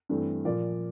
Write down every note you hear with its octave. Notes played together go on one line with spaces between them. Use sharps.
G2 E3 A3 C4
A#2 F3 A#3 F4 D5